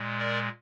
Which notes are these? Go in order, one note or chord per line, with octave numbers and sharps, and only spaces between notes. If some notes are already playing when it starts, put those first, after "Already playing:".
Already playing: A#2 G#3
A#4 D5